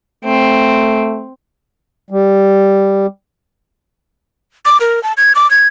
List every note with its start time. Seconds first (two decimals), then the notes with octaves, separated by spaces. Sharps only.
0.24 A3 C4
2.10 G3
4.65 D6
4.80 A#4
5.03 A5
5.17 G#6
5.35 D6
5.50 G#6